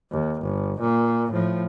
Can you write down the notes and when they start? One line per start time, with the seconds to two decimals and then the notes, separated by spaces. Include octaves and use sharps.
0.11 D#2
0.41 G1
0.81 A#2
1.31 A2 F3